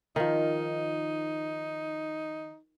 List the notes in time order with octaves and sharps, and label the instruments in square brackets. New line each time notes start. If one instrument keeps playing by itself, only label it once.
[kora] D#3 F3 [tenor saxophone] D#4